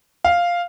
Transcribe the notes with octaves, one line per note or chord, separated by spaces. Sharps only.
F5